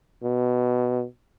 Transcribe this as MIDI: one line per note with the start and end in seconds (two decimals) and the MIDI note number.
0.23 1.05 47